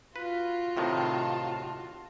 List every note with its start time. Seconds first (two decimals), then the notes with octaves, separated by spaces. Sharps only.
0.16 F4 F#4 B4
0.77 A2 C3 D#3 A5